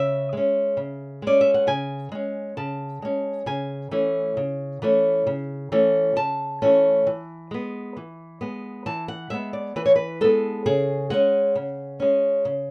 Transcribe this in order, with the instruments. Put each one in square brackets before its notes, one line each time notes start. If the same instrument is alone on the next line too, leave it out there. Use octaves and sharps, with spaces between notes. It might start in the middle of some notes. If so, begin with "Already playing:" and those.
Already playing: [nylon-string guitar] C#3 E5
G#3 C#4
C#3
G#3 C#4 D5
E5
F#5
C#3 G#5
G#3 C#4
C#3 A5
G#3 C#4
C#3 G#5
E3 A3 C#4
C#3
E3 A3 C#4
C#3
E3 A3 C#4
C#3 A5
E3 A3 C#4
E3
G#3 B3
E3
G#3 B3
E3 A5
F#5
G#3 B3 E5
D5
E3 B4
C#5
B4
G#3 B3 A4
C#3 G#4
G#3 C#4 F#5
C#3
G#3 C#4
C#3